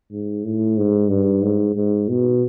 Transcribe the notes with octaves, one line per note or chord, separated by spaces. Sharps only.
G#2
A2
G#2
G2
G#2
G#2
B2